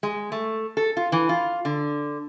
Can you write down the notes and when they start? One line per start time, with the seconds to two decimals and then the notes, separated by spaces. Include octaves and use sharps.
0.03 G#3
0.32 A3
0.77 A4
0.97 F4
1.12 E3
1.29 F4
1.65 D3